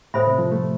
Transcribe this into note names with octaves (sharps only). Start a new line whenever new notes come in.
A2 A4 C5 E5 B5
C3
F3
A3